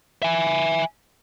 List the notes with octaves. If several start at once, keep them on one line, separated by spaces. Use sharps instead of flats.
E5 G#5